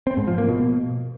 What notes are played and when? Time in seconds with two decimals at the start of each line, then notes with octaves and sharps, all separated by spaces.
0.07 C4
0.17 G#2
0.28 F3
0.38 A#3
0.49 B2